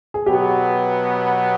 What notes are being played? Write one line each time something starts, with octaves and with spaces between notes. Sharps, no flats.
G#4
B2 F#3 B3 G4